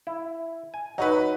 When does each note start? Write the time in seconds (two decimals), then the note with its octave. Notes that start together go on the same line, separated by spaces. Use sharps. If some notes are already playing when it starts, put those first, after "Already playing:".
0.07 E4
0.74 G#5
0.98 F#3 D#4 F#4 B4